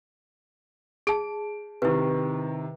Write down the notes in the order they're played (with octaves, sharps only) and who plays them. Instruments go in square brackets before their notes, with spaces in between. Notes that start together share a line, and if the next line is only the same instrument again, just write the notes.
[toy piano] G#4 A5 [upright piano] D7
[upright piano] C3 D#3 [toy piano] E4 B4